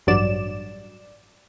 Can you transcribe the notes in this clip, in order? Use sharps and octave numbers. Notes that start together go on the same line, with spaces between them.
A1 G2 F#3 D5 E7